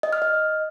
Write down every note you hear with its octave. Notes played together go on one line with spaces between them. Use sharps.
D#5
F6
D#5